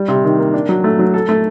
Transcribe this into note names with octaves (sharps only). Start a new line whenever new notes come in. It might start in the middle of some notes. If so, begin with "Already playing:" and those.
Already playing: G3
C3
D#3
A#3
D4
F#3
A3
F#3
A4
A3